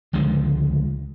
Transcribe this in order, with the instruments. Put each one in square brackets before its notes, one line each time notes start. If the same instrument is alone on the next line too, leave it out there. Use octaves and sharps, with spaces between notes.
[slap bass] C#2 D3 F3 G#3